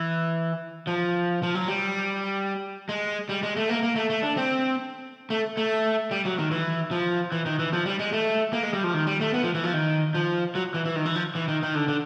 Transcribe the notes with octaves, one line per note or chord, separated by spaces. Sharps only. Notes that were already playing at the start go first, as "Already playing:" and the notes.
Already playing: E3
F3
F3
F#3
G3
G#3
G3
G#3
A3
A#3
A#3
A3
A3
D4
C4
A3
A3
G3
F#3
D#3
E3
F3
E3
D#3
E3
F3
G3
G#3
A3
A#3
G#3
G3
F3
D#3
G3
A3
B3
F3
E3
F3
D#3
F3
F#3
E3
E3
D#3
E3
F3
E3
D#3
D#3
D3
D3